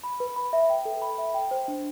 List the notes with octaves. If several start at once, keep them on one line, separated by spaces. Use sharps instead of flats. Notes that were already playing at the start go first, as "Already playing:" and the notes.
B5
B4
B5
E5
G5
A4
B5
E5
G5
C5
D4